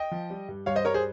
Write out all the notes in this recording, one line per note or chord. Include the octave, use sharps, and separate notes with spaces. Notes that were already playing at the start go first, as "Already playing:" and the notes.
Already playing: D#5 G5
F3
G3
G2
G2 C#5 F5
C5 D#5
G3 A#4 C#5
G#4 C5